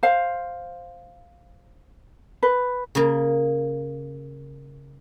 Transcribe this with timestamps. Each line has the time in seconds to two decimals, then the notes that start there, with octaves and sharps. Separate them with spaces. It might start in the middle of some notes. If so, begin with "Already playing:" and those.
0.03 C5 F5
2.43 B4
2.95 C#3 A#3